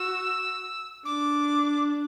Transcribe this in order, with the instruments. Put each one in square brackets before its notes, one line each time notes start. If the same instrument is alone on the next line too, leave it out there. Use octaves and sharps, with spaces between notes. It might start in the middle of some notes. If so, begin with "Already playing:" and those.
Already playing: [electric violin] F#4 [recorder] E6
[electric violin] D4 [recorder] D6